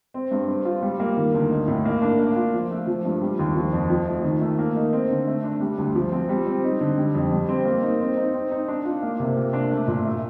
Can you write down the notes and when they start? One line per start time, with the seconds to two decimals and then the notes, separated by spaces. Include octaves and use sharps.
0.14 C4
0.31 G2
0.49 C4
0.65 F4
0.82 G3
1.00 A#3
1.17 D#3
1.34 D2
1.51 D#4
1.68 A2
1.85 A#3
2.02 D4
2.19 A#3
2.36 F4
2.54 F3
2.71 A3
2.87 F3
3.05 G2
3.22 G3
3.39 D#2
3.56 F3
3.73 F2
3.90 F3
4.08 A3
4.24 D#3
4.41 A3
4.59 A#3
4.75 D#4
4.93 C4
5.10 D3
5.27 A3
5.44 D4
5.61 G3
5.78 D2
5.95 F3
6.12 C4
6.29 G3
6.47 C4
6.64 D#4
6.81 D3
6.98 G3
7.15 F2
7.32 G3
7.49 C4
7.65 A#3
7.83 D#4
8.00 C4
8.17 D#4
8.34 C4
8.51 D#4
8.68 D4
8.85 F4
9.03 A#3
9.20 C3
9.37 A#3
9.53 D4
9.71 A3
9.88 A#2
10.05 A3